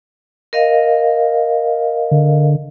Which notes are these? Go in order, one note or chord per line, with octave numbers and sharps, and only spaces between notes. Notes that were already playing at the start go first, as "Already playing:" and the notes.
A#4 D#5 F5
D3